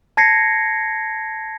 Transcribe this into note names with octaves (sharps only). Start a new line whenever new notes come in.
A5 G#6 A#6 C7 C#7